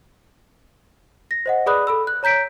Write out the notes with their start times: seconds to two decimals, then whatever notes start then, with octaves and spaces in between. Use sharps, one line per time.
1.31 A#6
1.46 C5 D#5 F#5
1.66 G#4 B4 D5 B5 D#6 F#6
1.87 A4 B5 E6
2.07 F#6
2.23 C#5 A#5 G6 B6 D7